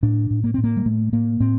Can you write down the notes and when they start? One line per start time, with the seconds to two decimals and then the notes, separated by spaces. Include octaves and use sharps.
0.03 A2 D4
0.30 A2
0.44 A#3
0.54 A2 C4
0.64 A#3
0.77 G3
0.85 A2 A3
1.12 A2 A#3
1.40 A2 C4